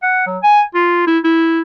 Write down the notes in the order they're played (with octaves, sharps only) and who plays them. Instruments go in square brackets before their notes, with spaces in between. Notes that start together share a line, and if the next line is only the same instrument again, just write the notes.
[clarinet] F#5
F#3
G#5
F4
E4
E4